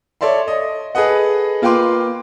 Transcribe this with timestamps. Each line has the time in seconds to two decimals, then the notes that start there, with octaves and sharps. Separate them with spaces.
0.21 A4 C#5 D5 E5 C6
0.48 D#5
0.95 G#4 A4 B4 D#5 F#5
1.62 A#3 F4 B4 G5 C6 D6